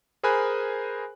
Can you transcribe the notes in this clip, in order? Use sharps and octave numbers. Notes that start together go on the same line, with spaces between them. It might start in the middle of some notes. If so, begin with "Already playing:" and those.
G#4 A#4 C5 G#5 B5 F#6